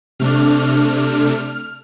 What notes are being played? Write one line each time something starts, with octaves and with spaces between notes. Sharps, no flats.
C3 A3 D4 F6